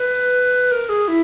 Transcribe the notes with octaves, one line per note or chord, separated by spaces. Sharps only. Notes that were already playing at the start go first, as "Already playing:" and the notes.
Already playing: B4
A#4
G#4
E4